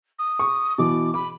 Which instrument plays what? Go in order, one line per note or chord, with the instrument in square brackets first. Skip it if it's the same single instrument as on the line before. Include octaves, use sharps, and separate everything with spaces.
[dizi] D#6
[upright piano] C#6
[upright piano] B2 E3 [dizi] D6
[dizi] B5 [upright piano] D6